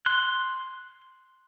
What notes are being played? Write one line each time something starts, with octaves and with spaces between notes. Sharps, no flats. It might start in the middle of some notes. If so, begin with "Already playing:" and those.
C6 F#6